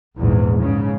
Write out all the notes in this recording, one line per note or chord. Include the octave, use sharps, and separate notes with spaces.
A#1 E2 G#2
G#2 C#3